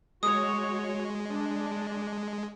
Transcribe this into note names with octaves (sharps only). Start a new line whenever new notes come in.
G#3 F#4 C#5 D#6
D4